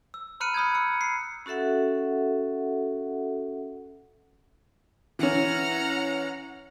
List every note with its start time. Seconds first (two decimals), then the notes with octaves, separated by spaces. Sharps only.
0.14 E6
0.40 A#5 B5 F6 F#6 C#7 D#7
0.54 B5 D#6 G6 G#6
0.74 E6 C#7
1.01 C7
1.46 C#4 F#4 A4 E5 F#5
5.19 E3 C#4 F#5 A#5 F6